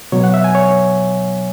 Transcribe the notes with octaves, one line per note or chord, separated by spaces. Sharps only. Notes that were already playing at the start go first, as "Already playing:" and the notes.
B2 F#3 B3 C#5
F#5
E5
G#5
C#5